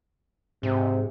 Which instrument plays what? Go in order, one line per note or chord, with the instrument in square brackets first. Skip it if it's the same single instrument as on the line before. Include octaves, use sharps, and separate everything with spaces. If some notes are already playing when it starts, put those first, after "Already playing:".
[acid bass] G#2 [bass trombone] C3